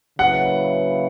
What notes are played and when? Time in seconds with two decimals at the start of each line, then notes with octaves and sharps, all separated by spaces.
0.19 C#3 F#3 A#3 E4 B4 F#5